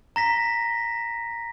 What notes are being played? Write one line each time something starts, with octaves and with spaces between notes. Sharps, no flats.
A#5 A#6 B6